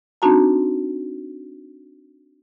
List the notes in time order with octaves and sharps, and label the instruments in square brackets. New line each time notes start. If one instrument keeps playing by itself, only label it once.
[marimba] C4 D4 D#4 F#4 A5 A#5